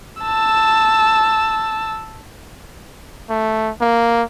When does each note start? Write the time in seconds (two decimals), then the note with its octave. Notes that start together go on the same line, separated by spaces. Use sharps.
0.22 A5 E6
3.30 A3
3.81 A#3